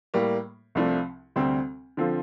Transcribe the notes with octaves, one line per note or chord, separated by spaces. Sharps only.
A2 G3 A#3
C2 C3 F3 A3 D4
D2 C3 G3 C4
D3 F3 C4 F4 A4